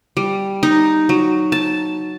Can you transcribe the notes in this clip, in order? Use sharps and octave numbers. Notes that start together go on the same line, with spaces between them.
G3
D#4
F#3
A5